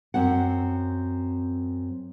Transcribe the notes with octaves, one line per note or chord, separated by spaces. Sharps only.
F#2 C4 F#4 F#5